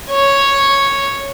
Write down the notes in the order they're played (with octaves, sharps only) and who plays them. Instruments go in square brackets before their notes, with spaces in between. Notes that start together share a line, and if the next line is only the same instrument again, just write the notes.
[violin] C#5